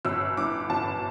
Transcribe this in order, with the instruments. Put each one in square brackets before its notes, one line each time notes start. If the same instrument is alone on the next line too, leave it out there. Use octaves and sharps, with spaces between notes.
[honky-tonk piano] G1 E6
G2 E3 D6
G1 A5